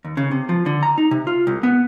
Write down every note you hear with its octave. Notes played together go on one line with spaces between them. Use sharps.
D#2
C#3
C3
F3
D3
A#5
D#4
C3
F4
C2
B3